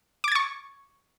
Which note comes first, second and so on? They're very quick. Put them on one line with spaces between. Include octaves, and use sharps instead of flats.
D6 G#6 A6 C#6